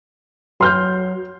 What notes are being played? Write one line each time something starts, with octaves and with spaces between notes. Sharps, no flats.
F#3 C6 F6 G6